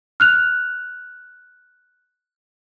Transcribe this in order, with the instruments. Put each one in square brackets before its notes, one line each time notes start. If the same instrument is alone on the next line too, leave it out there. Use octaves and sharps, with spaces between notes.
[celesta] F6 F#6 F7